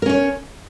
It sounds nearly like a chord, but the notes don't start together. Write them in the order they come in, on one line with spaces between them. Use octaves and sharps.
A#4 C#4 C#5